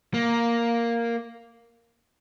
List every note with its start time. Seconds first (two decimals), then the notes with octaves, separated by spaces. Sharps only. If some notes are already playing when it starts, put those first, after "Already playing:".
0.14 A#3